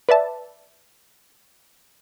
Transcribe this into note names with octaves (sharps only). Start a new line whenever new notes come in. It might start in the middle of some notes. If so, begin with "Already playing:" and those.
B4 D5 E5 A5